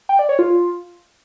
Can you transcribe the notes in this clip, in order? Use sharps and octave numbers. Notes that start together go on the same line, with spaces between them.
G5
D5
C#5
F4